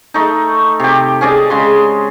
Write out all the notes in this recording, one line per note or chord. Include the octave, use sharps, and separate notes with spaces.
A3 D#4
C3 G4
C#4 G#4 D5 D#5
C#3 G#3 C6